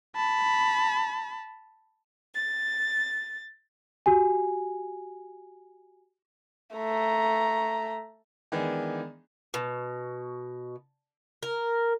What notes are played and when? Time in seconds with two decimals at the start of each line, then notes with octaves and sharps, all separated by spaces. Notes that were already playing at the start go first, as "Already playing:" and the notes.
0.16 A5 B5
2.34 A6
4.06 F#4 G4 G#5
6.76 A3 A#5
8.52 D#3 E3 G#3 B3 D4
9.54 B2
11.43 A#4